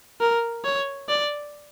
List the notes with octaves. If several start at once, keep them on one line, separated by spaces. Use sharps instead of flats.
A#4
C#5
D5